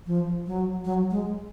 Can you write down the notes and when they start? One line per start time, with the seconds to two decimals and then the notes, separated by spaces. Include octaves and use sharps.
0.07 F3
0.47 F#3
0.85 F#3
1.11 G#3